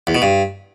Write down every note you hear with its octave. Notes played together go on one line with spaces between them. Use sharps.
E2
B2
G2